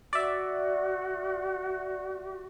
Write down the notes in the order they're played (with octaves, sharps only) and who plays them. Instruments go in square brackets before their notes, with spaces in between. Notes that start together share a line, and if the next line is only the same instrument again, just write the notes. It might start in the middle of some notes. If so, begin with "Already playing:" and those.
[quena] F#4 [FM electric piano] D5 E5